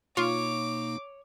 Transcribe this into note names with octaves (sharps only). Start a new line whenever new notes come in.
B2 A#3 D#4 F4 C#5 D6